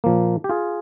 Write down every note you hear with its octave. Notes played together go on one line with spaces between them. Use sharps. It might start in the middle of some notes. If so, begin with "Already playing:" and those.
A#2 F3 A#3
G4
F4 G#4